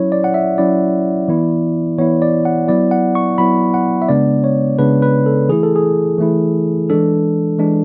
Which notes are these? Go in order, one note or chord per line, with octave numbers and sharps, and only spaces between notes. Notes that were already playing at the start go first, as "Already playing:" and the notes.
Already playing: F#3 C#4 E4 C#5
D5
F#5
E5
F#3 C#4 E4 D5
E3 B3 E4
E3 B3 E4 C#5
D5
F#5
F#3 B3 E4 D5
F#5
C#6
F#3 B3 E4 B5
F#5
E5
C#3 G#3 B3 D4 D5
C#5
C#3 G#3 B3 D4 B4
B4
A4
E3 A3 E4 G#4
A4
G#4
E3 A3 E4
E3 G#3 D4 A4
E3 G#3 D4